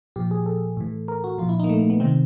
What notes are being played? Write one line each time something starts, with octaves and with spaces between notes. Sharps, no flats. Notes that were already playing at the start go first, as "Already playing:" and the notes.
A#2 F3 G4
G#4
A4
A2 E3
A#4
F#4
A#2 F3 F4
E4
D#4
A#3
A3
A#3
B3
C3 D#3 C4